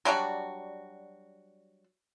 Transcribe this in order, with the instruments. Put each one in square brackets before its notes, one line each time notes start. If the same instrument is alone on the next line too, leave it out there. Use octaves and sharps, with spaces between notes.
[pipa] F#3 G3 D4 F#4